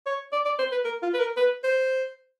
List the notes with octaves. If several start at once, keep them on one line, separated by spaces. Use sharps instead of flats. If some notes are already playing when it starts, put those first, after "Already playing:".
C#5
D5
D5
C5
B4
A#4
F4
B4
A#4
B4
C5